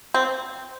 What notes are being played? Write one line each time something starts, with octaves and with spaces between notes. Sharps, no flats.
C4